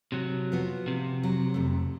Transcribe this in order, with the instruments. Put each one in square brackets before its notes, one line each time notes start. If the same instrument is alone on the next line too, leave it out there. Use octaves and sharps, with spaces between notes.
[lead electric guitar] C3 F#3
[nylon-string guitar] F3 B3 F#4
[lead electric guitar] C3
[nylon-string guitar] F#3
F2 A3